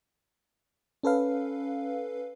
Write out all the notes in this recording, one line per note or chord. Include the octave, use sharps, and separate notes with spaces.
C#4 A4 B4 F5